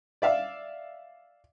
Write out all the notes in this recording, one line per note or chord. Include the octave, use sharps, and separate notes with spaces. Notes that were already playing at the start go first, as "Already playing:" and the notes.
D5 E5 F5